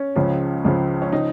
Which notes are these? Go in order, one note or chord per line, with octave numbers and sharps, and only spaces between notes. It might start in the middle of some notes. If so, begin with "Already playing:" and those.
Already playing: C#4
C#2 C#3 F3
C#2 C#3 F3
C#4
C#3 F3 D#4